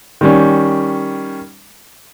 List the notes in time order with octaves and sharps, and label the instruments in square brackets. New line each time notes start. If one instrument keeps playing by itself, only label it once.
[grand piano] D#3 G3 C#4